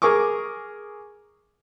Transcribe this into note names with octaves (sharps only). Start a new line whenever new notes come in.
G#4 A#4 G#5 C#6 D6